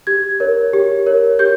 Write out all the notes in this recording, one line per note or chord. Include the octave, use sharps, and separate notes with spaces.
G4 G#6
A#4 C#5
G4
A#4 C#5
G4 G6